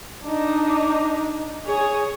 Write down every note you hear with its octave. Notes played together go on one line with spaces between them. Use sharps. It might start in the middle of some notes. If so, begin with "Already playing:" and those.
D4 D#4
G#4 C#5